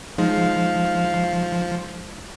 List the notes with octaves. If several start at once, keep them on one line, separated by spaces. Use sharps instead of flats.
F3 G#3 D#4 F5